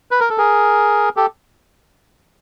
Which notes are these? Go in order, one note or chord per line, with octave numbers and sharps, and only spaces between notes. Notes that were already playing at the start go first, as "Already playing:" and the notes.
B4
A#4
A4
G#4 A#4
G4 A4